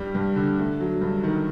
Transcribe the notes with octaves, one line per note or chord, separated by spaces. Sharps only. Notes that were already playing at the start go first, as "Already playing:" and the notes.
Already playing: G2 G3
G2
D3
A3
F#3
G2
D#3